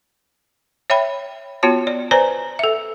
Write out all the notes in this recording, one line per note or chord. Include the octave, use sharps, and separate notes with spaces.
C#5 E5 G5 B5
B3 F4 F#4 C#5 A5
D5
B4 C5 D5 G#5 A#5
A4 E5